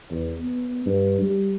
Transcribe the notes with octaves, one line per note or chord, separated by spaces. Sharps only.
E2
B3
G2
G3